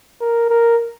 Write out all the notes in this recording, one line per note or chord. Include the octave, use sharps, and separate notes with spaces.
A#4
A#4